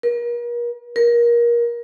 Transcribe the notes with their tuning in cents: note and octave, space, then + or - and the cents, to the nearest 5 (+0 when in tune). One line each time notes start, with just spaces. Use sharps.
A#4 +40
A#4 +25